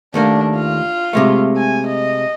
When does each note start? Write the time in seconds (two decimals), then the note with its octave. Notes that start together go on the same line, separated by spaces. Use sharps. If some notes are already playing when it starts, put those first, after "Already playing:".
0.14 D#2 A3 A#3 D4
0.56 F4
1.13 C3 G#3 A3
1.57 G#5
1.87 D#5